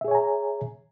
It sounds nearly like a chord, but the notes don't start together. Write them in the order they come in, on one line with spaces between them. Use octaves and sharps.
E5 G#4 C#5 G#5 A#5